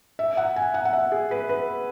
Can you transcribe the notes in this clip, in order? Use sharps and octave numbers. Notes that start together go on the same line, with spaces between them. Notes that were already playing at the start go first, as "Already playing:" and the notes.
E5
F#5
G#5
F#5
F#5
E5
G#4
B4
B4